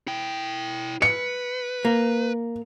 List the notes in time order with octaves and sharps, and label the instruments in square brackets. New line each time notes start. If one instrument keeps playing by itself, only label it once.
[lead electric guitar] E4 G5
[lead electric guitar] B4 [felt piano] C#7
[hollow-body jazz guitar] A#3